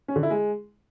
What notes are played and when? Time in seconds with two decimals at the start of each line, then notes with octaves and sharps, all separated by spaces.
0.08 C#4
0.16 D3
0.23 E4
0.30 G#3